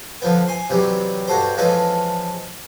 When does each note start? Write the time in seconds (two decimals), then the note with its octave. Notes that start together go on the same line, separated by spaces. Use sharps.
0.22 D3 F3 B3
0.48 G#5 C6
0.70 C3 E3 F#3 G3
1.27 G2 F#4 A4 C5
1.57 E3 F3 G#3 C#4 A4 B4